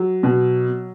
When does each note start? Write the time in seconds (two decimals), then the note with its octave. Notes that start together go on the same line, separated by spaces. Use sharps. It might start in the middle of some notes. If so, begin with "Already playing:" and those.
Already playing: F#3
0.23 B2